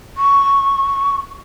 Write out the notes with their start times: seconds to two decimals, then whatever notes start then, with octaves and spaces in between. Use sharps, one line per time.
0.17 C#6